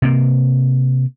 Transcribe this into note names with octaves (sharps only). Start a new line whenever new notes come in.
C3 A#3